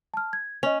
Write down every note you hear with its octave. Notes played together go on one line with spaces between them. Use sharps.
A5 F6
G#6
C#4 D#5 F7